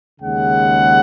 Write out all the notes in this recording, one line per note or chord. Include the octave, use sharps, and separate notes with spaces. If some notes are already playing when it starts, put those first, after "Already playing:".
D#2 C#3 G#3 F#5